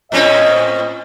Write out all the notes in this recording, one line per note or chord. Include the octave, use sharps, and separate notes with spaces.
A2 C4 C#4 D#5